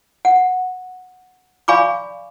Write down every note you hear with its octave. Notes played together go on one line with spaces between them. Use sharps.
F#5
D5 F5 G#5 B5 C#6 D6